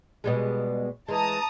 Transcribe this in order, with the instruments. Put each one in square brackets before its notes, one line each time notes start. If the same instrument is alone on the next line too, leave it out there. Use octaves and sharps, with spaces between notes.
[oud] B2 G3 G#3
[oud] E3 G#3 [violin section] A5 A#5 D#6